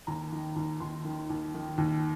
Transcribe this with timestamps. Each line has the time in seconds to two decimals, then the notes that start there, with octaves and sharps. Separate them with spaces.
0.07 D#2 A#5
0.32 D#3
0.56 D#2
0.80 D#2 C6
1.05 D#3
1.30 D#2
1.54 D#3
1.78 D#2